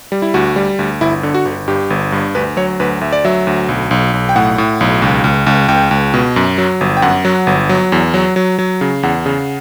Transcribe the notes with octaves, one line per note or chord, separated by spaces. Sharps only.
G3
E4
D2 F#4
G3
D2
G1 E4
D3
F#4
G1
G2 G4
G1
G2
D2 B4
F#3 C#5
D2 B4
D2 E5
D5
F#3 E5
D2
B1
B1
B1
G5
A2 F#5
A2
B1
C#2
C#2
C#2
C#2 G5
C#2
B2
F#2
F#3
G1
G5
F#2 F#5
F#3
G1
F#3
E2
F#3
F#3
F#3
C#3
E2 F#5
C#3